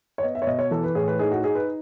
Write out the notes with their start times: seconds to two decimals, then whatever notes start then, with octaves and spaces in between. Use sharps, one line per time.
0.18 C#5
0.23 B3 D#5
0.35 E5
0.42 C#5
0.47 B2 D#5
0.59 C#5
0.71 E3 A4
0.84 B4
0.95 A2 G#4
1.08 B4
1.19 D#4 G#4
1.32 F#4
1.44 D#4 G#4
1.55 B4